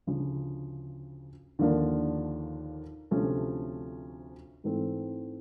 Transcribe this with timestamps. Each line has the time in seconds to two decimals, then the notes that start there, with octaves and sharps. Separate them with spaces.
0.07 D2 C#3 F3
1.59 D#2 D3 F3 A#3 D4
3.11 D2 C3 F3 A3 C#4
4.64 G#2 E3 A3 C4